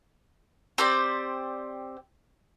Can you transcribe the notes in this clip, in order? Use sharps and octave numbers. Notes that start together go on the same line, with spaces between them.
C4 G4 C5 D5